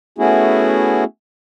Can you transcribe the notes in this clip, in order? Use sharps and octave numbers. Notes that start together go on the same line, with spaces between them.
A3 B3 C#4 E4 F#4 G#4